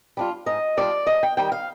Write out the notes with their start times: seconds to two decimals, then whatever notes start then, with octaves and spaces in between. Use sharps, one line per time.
0.17 G3 D4 F4
0.46 G#2 D#5
0.77 G3 D4 F4 D5
1.07 G#2 D#5
1.23 G5
1.37 D#3 G3 G5
1.52 F5